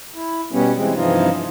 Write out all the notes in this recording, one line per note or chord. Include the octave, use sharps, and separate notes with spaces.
E4
B2 G3 B3 C#4
E3 G#3 C4
G2 C3 E3 F3 D#4 F4